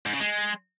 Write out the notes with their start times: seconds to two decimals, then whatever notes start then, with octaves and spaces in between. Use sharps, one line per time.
0.06 G#2
0.13 C#3
0.21 G#3